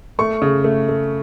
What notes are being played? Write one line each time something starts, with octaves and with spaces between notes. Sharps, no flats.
A3 C#6
C#3
A3
A3